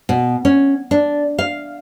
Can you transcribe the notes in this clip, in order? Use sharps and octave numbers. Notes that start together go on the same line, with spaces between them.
B2
C#4
D4
F5